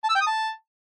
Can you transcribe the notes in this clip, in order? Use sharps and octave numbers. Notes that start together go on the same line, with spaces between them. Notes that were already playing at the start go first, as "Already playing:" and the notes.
A5
E6
G5
D#6
A5